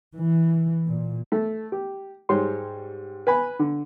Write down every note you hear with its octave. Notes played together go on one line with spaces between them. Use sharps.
E3
A#2
A3
G4
G#2 G3 C#5 C6
B4 G#5 B5
D3